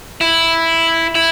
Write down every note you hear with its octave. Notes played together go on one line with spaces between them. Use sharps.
E4
E4